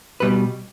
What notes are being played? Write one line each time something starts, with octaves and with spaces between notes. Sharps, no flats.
B2 G3 B4